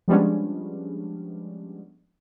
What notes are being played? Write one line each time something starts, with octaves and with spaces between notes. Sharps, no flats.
F3 G3 G#3 B3 C#4 D4